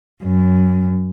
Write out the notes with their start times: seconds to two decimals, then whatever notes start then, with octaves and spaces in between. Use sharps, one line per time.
0.23 F#2